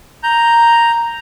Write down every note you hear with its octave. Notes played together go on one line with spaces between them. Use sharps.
A#5 G6